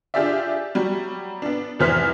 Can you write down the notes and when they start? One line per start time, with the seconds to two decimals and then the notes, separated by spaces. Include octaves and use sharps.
0.14 D4 F4 G4 G#4 D5 E5
0.75 F#3 G3
1.42 B3 D4
1.79 F1 C2 E3 C5 F6 B6